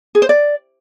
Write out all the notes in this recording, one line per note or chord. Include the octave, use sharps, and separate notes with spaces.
G#4
C5
D5